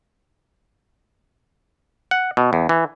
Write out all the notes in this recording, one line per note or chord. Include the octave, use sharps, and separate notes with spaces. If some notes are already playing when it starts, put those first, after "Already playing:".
F#5
B2
E2
E3